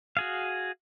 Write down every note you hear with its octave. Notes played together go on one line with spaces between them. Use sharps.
F#4 G#4 F5